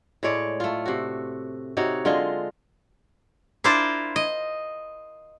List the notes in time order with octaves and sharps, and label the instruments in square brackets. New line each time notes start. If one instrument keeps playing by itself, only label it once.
[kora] A2 G#3 C#5 D5
A3 F4
C3 F#4
C3 D#4 F#4 C#5
D3 G#3 F4 D#5
[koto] D4 E4 F4 A#4 C5 D5
D#5